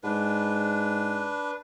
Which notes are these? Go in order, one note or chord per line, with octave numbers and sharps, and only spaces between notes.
G#2 D4 B4